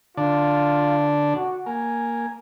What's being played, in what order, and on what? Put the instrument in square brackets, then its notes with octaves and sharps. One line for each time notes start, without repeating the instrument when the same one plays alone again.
[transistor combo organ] D3 D4 [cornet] F4
[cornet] F#4
[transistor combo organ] A#3 [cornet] G#5